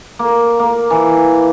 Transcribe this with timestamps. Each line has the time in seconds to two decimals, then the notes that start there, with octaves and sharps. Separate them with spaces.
0.19 A#3
0.59 A#3
0.90 E3